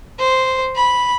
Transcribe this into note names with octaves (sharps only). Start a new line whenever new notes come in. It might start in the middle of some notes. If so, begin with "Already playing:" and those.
C5
B5